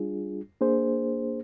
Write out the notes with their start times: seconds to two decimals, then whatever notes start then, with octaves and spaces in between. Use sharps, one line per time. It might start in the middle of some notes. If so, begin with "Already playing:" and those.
Already playing: G3 D4 F4 G#4
0.61 A#3 D4 G#4 C5